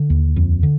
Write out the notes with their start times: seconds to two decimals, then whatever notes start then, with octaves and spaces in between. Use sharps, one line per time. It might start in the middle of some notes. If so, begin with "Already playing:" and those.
Already playing: D3
0.10 D#2
0.36 F2
0.63 D3